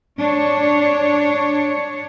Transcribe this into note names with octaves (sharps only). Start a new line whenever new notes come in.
D4 C#5